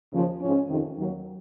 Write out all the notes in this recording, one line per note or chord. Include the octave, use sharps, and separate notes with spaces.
D#2 C#3 F3
G#2 F3 C#4
F2 C3 D#3
D#2 D#3 F#3